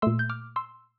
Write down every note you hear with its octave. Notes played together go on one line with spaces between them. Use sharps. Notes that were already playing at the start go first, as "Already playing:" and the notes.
A#2 A3 C6 E6
G6
D6 F6
C6 E6